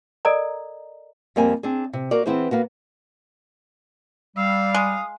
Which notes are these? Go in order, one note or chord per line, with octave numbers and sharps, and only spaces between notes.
A4 A#4 D5 D#5 A#5
F2 G3 A#3 C4 G#5
C4 D4 G#4
C3
A#3 F#4 A#4 D5
E3 B3 C4 E4 G#4 C5
A#3 B3 F#4
G3 F5 E6
G#3 D#6